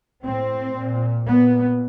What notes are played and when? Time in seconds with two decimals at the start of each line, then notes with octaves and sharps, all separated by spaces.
0.25 A2 C4
0.76 A#2
1.28 A#2 B3